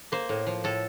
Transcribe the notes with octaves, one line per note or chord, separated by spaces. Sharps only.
A#3 C5
A2
F3
A2 A4